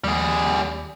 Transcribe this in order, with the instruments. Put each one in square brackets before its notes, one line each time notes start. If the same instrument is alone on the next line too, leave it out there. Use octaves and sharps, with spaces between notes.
[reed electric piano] D#2 [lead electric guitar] G3 G#4